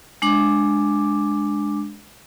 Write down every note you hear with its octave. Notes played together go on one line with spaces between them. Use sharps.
G#3 D4 D6